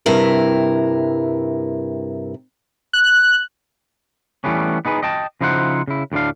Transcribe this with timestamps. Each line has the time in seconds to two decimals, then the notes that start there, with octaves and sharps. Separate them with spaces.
0.06 G2 C3 E4 A#4
2.93 F#6
4.44 E3 G3 A3 B3 C#4
4.85 B3 D#4 G#4 B4
5.03 D#5 G5 A5
5.41 C#3 F3 D#4 E4 C5 F#5
5.88 C#3 E4
6.12 D2 A2 A#3 D4 F5